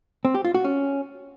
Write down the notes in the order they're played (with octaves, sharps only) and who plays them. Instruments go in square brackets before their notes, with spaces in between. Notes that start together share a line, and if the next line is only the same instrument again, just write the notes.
[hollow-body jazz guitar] C4
G4
F4
F#4
C#4